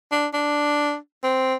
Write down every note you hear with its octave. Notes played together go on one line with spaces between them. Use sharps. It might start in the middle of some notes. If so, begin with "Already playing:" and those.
D4
D4
C4